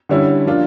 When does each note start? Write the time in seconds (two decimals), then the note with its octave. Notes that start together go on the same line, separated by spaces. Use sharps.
0.09 D3 G3 C#4 E4
0.46 F3 A#3 D4 F4